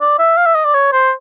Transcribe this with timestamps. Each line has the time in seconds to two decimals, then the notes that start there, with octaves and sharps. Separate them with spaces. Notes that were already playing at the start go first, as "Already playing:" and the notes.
0.01 D5
0.19 E5
0.37 F5
0.46 E5
0.55 D#5
0.65 D5
0.74 C#5
0.92 C5